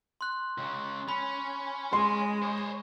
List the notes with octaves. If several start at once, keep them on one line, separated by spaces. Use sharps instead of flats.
C6 F#6
C#2 C#3
C#4 B5
G#3 C6
C5 C#5